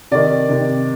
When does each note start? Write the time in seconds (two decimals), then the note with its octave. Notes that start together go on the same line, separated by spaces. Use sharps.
0.11 C3 D#3 D5
0.49 C3 D#3